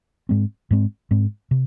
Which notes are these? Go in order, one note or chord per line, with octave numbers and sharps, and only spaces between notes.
G#2 G#3 C4
G#2 G#3 C4
G#2 G#3 C4
C3